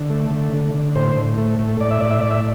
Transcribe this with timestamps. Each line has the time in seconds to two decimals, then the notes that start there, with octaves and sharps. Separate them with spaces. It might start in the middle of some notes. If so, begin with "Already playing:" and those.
Already playing: D3
0.10 A3
0.30 D3
0.53 D3
0.74 D3
0.95 A2 C5
1.16 A2
1.38 A3
1.59 A2
1.80 A2 D5
1.91 E5
2.00 A2 D5
2.10 E5
2.21 A2 D5
2.31 E5